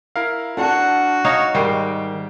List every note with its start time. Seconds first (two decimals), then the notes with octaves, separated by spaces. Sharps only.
0.16 E4 A#4 F5
0.57 D4 F#4 F#5 A5
1.25 D#4 C#5 F5
1.54 G#2 D#3 G3 G5 C7